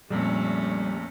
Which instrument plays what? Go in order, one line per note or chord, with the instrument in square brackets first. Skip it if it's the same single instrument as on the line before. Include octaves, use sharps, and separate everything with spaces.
[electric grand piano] A#1 F2 A#2 [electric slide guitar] G3 [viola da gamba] A3 C#4